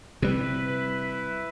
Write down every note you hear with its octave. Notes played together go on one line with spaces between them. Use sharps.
C3 G3 E4 B4